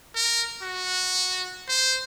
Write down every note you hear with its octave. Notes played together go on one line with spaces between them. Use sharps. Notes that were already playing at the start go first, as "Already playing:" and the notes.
A#4
F#4
C5